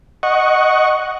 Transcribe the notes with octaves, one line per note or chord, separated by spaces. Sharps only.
D#5 F#5 C#6